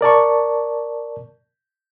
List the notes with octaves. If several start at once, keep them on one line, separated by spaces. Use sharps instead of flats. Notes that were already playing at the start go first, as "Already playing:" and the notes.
A#4 D5 A5 C#6